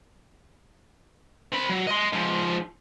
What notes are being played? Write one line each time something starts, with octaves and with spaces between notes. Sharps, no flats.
C4 B5
F#3
D#5 C6
G#2 F3